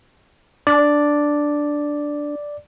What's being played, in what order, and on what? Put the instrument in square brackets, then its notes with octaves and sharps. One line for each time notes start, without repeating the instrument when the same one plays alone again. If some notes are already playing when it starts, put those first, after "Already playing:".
[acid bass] D4 [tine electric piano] D5